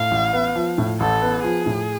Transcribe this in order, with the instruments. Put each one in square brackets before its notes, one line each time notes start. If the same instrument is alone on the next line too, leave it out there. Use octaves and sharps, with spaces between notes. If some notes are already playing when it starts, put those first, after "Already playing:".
Already playing: [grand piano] A2 [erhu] F5
[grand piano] A1
B3
F3
A2
[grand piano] A1 [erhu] A4
[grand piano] B3
[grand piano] F3 [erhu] G#4
[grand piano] A2